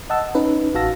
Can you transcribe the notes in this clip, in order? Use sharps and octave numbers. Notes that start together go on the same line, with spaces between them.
D#5 F#5 A5 E6
C#4 D#4 B4
A1 F#4 F5 A5 E6 A#6